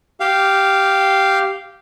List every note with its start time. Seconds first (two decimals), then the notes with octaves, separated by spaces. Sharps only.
0.20 G4 F5